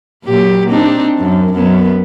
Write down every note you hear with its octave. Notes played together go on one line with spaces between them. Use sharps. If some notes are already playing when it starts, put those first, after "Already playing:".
A#2 F#3 G4
C4 D4 D#4
F#2
F#2 B3